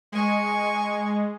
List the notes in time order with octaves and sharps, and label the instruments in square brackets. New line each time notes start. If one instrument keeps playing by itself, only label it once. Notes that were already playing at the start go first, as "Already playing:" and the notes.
[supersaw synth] G#3 [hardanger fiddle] G#5 C#6